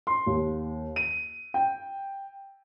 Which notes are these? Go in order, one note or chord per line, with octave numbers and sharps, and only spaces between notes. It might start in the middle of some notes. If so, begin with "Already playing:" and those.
C6
D#2
D#7
G5